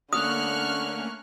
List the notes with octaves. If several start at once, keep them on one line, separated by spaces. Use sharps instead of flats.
D3 A3 A#3 C#4 C#6 D#6 F6 F#6